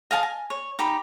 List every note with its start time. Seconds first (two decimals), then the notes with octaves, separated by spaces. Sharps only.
0.11 D#5 F5 G#5 A5
0.23 G#5
0.50 C#5
0.79 D#4 G4 B5